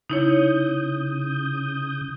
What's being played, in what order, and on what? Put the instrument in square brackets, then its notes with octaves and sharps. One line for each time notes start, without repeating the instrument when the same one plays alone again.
[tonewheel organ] C#3 D#6 G6 [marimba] D#4 E4 C#5